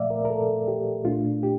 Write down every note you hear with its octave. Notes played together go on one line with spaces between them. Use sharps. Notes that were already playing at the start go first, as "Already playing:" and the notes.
Already playing: A#2 F3 A3 D5 E5 F5
A#4
A#4
A4
G4
A#2 A3 D4 F4
G4